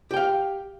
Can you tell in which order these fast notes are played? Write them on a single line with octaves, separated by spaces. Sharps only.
G4 G5 F5